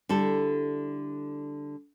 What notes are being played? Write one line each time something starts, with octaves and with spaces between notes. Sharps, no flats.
D3 G3 E4 A4